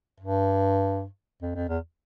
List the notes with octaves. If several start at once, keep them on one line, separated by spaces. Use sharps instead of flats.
G2
F2
F2
E2